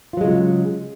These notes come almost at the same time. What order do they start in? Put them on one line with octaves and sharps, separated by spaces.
F4 F#3 G#3 C#3